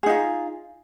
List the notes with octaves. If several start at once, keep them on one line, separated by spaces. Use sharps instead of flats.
D#4 F4 G#4